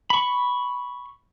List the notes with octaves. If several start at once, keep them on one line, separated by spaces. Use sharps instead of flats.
B5 C#6